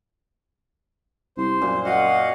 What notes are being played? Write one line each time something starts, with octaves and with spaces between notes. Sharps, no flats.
C2 C5
F#2 A#2
F#4 D#5 F5 F#5